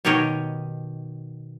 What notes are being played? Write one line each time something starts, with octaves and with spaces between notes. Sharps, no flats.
B2 D#3 G4 A#4 C#5 D#5